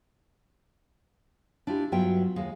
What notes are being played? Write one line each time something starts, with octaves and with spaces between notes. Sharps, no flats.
D4 E4 F4 G4
G2 F#3 B3 F4 E5 G5
D#2 G#3 F5